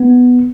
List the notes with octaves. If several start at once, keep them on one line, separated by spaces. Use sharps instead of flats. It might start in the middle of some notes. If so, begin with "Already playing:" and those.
Already playing: B3